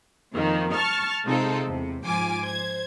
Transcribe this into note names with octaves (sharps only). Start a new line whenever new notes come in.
F2 D#3 A#3
A5 C#6 F6
C3 G#3 C4 D#4 F4 A4
E2 C3
G#2 F3 F4 G#5 D6
C5 G#6